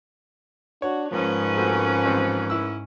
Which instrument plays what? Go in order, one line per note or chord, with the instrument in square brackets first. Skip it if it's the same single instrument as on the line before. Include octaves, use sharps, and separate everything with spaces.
[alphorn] D4 [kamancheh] F#4 [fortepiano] C#5
[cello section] G#2 C#4 [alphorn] F3 [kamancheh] A#4 B4
[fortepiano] A3 C4 F#4
A1 C4
E4 E6